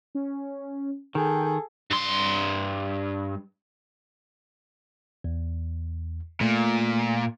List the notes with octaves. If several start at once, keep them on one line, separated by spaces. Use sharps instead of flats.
C#4
D#3 G#4 A4 G5
G2 C6
E2
A#2 A3